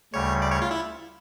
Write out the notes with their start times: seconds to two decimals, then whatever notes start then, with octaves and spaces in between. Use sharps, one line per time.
0.14 D2 C#3 G3 C#5
0.42 D5
0.51 C#5
0.62 F4
0.71 E4